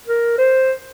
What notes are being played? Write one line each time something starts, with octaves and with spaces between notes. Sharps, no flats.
A#4
C5